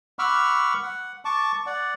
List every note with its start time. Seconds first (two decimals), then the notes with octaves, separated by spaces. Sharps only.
0.19 F#5 B5 C#6 D6 E6 F6
0.83 F#5
1.25 A5 C#6 D6
1.66 D5 F#5